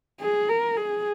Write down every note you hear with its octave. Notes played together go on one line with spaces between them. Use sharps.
G#4
A#4
G#4